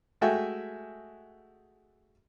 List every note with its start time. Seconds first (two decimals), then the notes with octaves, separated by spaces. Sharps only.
0.21 G#3 A3 F#4 E5 G5 G#5